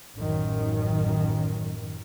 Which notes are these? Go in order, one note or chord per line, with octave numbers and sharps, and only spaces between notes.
A1 F#2 D#3